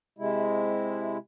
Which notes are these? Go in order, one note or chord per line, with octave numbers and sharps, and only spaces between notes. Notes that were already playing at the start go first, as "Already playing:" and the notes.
C3 G#3 E4